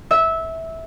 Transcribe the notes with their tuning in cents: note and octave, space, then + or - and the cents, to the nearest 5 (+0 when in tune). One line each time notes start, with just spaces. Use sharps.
E5 -15